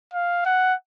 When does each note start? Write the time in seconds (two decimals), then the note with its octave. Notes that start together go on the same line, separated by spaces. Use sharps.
0.14 F5
0.46 F#5